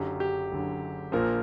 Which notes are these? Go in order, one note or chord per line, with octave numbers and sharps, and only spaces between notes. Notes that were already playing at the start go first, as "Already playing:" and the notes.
Already playing: F#1 F#2 D3 G4
G4
F#1 F#2 D3
A#1 A#2 F3 A#4